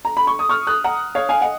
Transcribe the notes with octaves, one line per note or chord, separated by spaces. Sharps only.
A#5
B5
C#6
D#6
C#6 F6
D#6 F#6
F#5 A#5
C#5 F5
F5 G#5
D#5 F#5